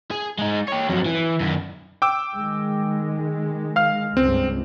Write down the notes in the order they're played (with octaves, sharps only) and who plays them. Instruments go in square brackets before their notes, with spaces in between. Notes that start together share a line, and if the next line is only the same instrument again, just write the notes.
[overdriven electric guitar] G#4
G#3 D#4
G4 C#5
F2 F#3
E3
F#2 D#3
[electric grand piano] G5 D6 E6
[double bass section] D#3 G#3
[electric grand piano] F5 F6
[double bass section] C#2 G2 [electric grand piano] C4